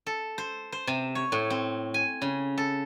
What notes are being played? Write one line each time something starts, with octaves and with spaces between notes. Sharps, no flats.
A4
C5
C5
C3
C#5
A2
C4
G#5
C#3
A4